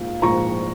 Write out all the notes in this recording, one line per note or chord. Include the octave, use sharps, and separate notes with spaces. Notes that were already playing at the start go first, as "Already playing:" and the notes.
Already playing: A#1 G#2 A#3 F5
A#1 G#2 F3 A#3 A#5 C#6